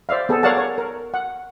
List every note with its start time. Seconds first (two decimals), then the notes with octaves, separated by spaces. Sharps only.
0.09 C5 D5 E5 F5
0.29 B3 G#4 A4
0.43 A#4 C#5 D5 F5 F#5 A5
0.57 C#5
0.78 A#4
1.14 F#5